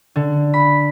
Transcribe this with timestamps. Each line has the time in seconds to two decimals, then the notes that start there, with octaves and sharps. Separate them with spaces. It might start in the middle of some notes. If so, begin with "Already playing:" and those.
0.16 D3
0.54 B5